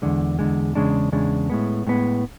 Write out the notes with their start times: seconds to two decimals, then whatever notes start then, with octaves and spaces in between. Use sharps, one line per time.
0.02 E2 D3 G#3
0.39 E2 D3 G#3
0.75 E2 C#3 G#3 D4
1.12 E2 C#3 G#3 D4
1.50 A2 G#3 B3
1.87 A2 G#3 B3